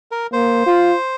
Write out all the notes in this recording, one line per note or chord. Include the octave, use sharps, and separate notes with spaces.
A#4
A#3 C5
F4